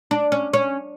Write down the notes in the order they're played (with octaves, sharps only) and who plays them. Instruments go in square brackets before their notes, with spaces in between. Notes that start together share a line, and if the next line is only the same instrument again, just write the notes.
[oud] D4
C#4
C#4